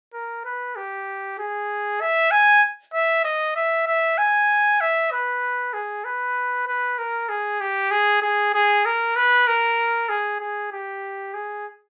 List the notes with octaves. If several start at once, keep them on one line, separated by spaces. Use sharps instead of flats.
A#4
B4
G4
G#4
E5
G#5
E5
D#5
E5
E5
G#5
E5
B4
G#4
B4
B4
A#4
G#4
G4
G#4
G#4
G#4
A#4
B4
A#4
G#4
G#4
G4
G#4